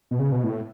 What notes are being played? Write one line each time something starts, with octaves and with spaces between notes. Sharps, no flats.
B2
C#3
B2
A2